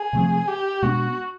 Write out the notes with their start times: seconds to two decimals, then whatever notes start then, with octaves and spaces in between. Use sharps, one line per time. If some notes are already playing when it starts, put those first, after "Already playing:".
Already playing: G#4
0.13 C3 F3 A3 C4
0.48 G4
0.82 B2 G#3 B3 D4 F#4